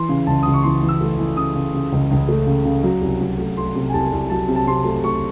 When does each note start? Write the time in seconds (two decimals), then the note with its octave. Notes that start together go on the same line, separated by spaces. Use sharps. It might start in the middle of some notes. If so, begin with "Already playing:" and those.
Already playing: E3 C6
0.09 C#3
0.27 C#2 A5
0.43 C#2 D#6
0.54 C#6
0.63 E3 C6
0.83 E3
0.89 E6
1.01 A3
1.19 E3
1.36 C#3 D#6
1.55 C#3
1.74 C#3
1.92 C#2
2.11 C#2
2.28 A3
2.47 C#3
2.65 C#3
2.84 F#3
3.01 C2
3.21 F#3
3.38 A3
3.57 A3 C6
3.75 C3
3.89 G#5
3.93 C2 A5
4.12 C2
4.30 F#3 A5
4.48 C3
4.56 A5
4.66 C3 C6
4.85 A3
5.04 A3 C#6